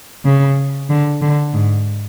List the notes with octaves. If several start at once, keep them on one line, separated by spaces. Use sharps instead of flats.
C#3
D3
D3
G#2